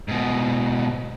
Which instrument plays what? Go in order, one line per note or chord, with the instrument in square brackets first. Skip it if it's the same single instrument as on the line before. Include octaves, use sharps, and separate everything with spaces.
[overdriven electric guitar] G#2 B2